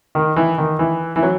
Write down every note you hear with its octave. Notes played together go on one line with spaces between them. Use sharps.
D#3
E3
D#3
E3
E3
F#3